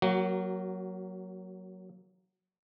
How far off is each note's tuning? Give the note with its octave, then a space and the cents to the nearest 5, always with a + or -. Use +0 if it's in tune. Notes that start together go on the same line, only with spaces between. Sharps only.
F#3 +0 A#3 +0 F#4 +30